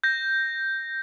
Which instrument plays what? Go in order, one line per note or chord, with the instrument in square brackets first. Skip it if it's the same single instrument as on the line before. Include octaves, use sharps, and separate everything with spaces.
[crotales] G6 A#6